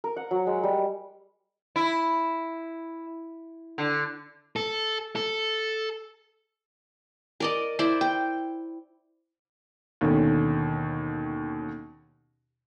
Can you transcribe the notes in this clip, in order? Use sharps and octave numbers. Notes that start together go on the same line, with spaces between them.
A#4
F#5
F#3
G#3
G3
E4
D3
A4
A4
A#4 D5 D#5
E4 C5 D5
G5
D#2 B2 D3 D#3 C#4